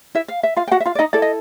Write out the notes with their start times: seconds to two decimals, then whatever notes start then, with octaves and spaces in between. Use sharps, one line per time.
0.15 E4 E5
0.28 F5
0.43 E5
0.56 F4 F5
0.68 G5
0.71 F#4 F#5
0.80 E5
0.86 F4 F5
0.95 D5
0.99 D#4 D#5
1.13 E4 A4 D5
1.22 D#5